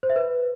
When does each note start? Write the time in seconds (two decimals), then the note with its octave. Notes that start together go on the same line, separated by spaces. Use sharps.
0.03 C5
0.10 E5
0.16 B4